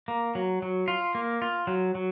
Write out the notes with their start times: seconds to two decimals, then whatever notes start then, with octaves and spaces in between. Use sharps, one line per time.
0.08 A#3
0.35 F#3
0.62 F#3
0.88 F4
1.15 A#3
1.42 F4
1.67 F#3
1.95 F#3